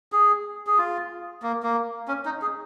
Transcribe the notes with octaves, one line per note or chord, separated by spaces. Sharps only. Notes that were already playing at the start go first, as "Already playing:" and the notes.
G#4
G#4
F4
A#3
A#3
C#4
D#4
G#4